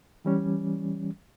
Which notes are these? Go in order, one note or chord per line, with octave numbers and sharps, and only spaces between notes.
E3 G3 C#4